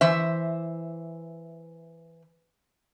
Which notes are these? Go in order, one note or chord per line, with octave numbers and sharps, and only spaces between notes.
E3 C5 E5